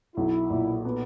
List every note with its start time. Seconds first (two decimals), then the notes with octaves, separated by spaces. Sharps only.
0.16 B1 E4
0.50 A#2
0.85 B3